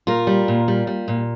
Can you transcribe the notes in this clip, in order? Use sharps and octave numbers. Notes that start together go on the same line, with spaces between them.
A#2 F4 A#4
G3
A#2
G3
G3
A#2